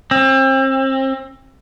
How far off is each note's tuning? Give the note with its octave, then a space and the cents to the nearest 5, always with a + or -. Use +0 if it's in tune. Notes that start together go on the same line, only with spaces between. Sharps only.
C4 +35